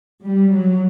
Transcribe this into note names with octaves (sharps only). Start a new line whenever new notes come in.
G3
F#3